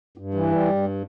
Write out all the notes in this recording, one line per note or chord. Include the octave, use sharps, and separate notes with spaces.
G2
E3
G3
G2